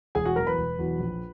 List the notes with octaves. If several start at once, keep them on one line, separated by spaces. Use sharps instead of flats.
E1 G#4 G#5
F#4 F#5
E2 B2 F#3 A#4 A#5
B4 B5
E1
E2 B2 F#3
A#1